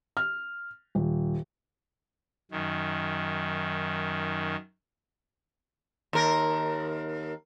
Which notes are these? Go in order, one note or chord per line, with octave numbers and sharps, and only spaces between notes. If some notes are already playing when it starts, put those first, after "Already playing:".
F6
D#1
F#2 D#3
D#2 A#4